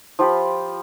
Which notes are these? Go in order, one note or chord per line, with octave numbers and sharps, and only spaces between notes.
F3 F4 G4 B5